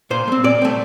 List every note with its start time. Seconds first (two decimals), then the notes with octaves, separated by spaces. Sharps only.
0.10 A#2 C5
0.28 A3
0.32 C4
0.44 A#2 D5
0.62 A3 C4